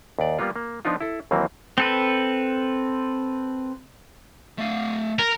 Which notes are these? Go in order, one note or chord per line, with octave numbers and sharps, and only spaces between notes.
D#2 D5
G3 A#3 B3 F4
A#3
F3 B3 D4 D#4 F4
E4 A4
D#2 E3 F#3 A#3 C4
C4 A4 B4
A3 F5
A#4